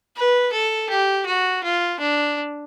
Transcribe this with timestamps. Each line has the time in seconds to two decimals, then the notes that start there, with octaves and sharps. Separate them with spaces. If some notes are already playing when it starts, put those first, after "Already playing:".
0.16 B4
0.52 A4
0.89 G4
1.26 F#4
1.64 F4
2.00 D4